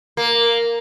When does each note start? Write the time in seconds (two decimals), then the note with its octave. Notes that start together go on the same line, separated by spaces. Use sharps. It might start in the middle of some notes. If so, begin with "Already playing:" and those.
0.17 A#3